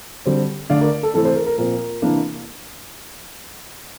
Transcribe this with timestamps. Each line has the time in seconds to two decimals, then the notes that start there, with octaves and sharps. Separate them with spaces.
0.26 D3 G3 C4
0.70 D3 A3 D4 D5 F5
0.81 A#4 D5
1.03 A4
1.14 C3 E3 A3 C4 A4
1.25 A4 C5
1.36 A#4
1.46 A#4
1.57 A#2 F3 C4 A#4
2.02 C3 E3 A#3 D4